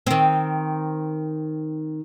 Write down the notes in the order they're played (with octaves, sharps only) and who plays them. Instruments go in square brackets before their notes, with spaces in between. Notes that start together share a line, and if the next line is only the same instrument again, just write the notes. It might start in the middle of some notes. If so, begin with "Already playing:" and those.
[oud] D#3 C4